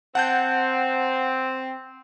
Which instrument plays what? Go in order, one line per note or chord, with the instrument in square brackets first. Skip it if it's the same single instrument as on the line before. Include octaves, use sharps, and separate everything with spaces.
[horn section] C4 [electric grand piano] F#5 A5 G6